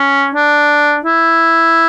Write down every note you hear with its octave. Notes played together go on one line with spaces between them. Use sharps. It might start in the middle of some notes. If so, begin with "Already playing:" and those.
Already playing: C#4
D4
E4